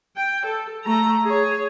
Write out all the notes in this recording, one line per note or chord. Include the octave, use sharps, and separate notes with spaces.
G5
A4
A3 A#5
G#4 C#5